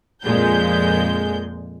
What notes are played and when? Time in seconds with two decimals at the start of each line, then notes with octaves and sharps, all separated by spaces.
0.22 F2 A#2 G#3 G6